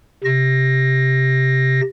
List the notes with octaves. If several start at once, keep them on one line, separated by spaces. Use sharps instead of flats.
C3 A#6